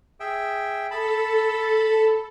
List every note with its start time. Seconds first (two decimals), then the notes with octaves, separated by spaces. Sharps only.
0.20 G#4 E5 G5
0.91 A4 A5 B5